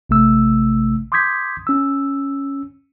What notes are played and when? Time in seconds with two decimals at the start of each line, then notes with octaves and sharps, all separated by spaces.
0.10 A1 C3 A3 E6
1.12 C6 D6 D#6 G6 G#6 B6
1.67 C#4 E6